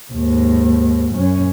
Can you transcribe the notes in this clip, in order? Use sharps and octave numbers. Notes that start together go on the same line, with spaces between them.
D#2 G#2
F#2 C#4